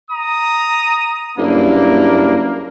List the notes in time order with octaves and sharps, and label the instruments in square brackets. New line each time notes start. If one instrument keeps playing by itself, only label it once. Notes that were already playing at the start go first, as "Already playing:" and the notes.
[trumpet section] A#5 D#6
[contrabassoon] F#1 [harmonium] G2 D4 E4 [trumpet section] A#3